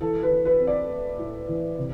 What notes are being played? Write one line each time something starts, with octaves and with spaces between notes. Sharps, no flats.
E3 A4
B4
E3
B4
C4
D5
A3
A2
E3
C3